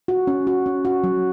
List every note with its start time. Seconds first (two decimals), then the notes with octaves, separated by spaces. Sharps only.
0.08 F#4
0.27 C#4
0.47 F#4
0.66 C#4
0.85 F#4
1.04 F#3